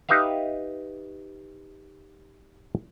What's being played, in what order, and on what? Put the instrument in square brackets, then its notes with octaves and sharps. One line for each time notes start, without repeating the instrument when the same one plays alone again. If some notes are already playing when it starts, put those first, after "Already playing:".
[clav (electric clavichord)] D#4 G4 B4 E5 F5